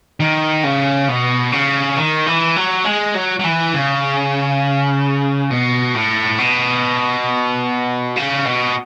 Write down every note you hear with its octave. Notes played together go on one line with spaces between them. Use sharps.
D#3
C#3
B2
C#3
D#3
E3
F#3
G#3
F#3
F#3
E3
C#3
B2
A2
B2
C#3
B2